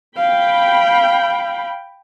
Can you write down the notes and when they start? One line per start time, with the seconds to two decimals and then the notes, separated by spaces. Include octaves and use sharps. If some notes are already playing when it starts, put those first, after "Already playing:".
0.17 F5 G5 B5